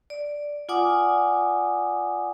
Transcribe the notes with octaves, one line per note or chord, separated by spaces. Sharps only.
D5
F4 D5 F#5 G#5 D6 D#6